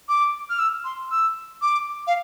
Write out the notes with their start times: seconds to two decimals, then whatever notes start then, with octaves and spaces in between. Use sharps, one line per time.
0.09 D6
0.50 F6
0.59 E6
0.84 C6
1.11 E6
1.62 D6
2.07 F5